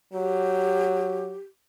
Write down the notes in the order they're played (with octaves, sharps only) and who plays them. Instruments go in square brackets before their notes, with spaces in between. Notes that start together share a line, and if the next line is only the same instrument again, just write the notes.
[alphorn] F#3 [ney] G4